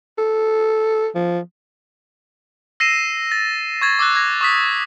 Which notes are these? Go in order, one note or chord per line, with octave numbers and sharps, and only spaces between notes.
A4
F3
E6 A#6 C7 D#7 E7
A6
C#6 G#6 A6
D6 E6 F#6
G#6 A#6
C#6 D#6 B6